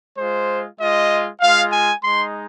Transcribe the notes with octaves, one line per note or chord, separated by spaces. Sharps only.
G#3 F4 C5
G#3 F4 D#5
G#3 F4 F5
G#5
G#3 D#4 C6